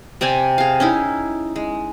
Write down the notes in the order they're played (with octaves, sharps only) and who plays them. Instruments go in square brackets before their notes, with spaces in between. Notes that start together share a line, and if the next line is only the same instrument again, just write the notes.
[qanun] C3 C4 D5 G#5
G#4 F5
C#4 D#4 E4
G#3